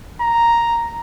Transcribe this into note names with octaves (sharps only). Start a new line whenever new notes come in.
A#5